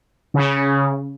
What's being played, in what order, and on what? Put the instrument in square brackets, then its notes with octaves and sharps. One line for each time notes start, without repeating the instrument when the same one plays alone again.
[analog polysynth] C#3